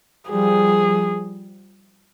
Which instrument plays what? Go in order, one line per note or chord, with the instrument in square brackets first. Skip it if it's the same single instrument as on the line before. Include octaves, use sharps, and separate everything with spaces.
[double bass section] F3 G3 [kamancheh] G#4